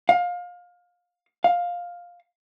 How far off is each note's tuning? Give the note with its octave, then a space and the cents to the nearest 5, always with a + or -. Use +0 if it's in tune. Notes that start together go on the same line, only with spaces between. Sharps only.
F5 +25
F5 +10